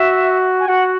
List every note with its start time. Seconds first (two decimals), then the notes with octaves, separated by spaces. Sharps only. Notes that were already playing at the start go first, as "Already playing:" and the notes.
Already playing: F#4 E5
0.60 G#5
0.68 F#4 F#5